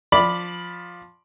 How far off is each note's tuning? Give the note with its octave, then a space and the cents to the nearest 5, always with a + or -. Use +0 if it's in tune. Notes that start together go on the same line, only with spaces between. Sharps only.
F3 +10 D5 +0 B5 -5